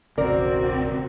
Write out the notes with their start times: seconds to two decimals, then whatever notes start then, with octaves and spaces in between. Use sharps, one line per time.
0.18 E1 A1 C#3 C4 F#4 A#4 D5